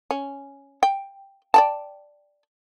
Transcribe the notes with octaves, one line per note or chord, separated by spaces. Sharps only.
C#4
G5
D5 G5 A5